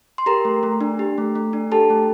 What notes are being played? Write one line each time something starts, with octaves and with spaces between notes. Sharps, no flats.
C6
G4 A#4 A#5
A3
A3
D4
G4
A3
A3
D4
G4 A4 A5
A3